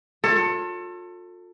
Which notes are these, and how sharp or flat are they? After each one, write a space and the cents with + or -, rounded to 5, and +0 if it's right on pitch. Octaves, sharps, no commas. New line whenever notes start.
F4 +40 A4 +25 C#5 +0